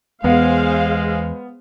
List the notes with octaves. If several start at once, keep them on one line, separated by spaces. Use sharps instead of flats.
E2 G#3 B3 G#4 C5 F5